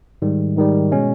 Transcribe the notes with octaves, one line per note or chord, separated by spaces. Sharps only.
G#2 D#3 G3
G#2 D#3 G3
B2 G#3 C#4